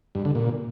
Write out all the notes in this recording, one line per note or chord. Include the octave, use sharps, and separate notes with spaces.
G2
D3
A#2